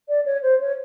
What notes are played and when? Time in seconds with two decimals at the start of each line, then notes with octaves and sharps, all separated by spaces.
0.09 D5
0.26 C#5
0.43 C5
0.60 C#5